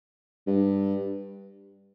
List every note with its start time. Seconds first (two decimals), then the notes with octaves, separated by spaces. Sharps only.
0.47 G2